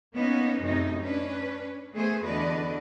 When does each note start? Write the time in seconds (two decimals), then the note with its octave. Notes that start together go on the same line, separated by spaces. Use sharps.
0.14 A#3 B3 C#4 D#4
0.62 F#2 A2 C3 D#4
1.00 C#4 D4 B4
1.93 D#3 A3 B3 G#4 C5
2.24 E2 D3 F#4 B4 D5 D#5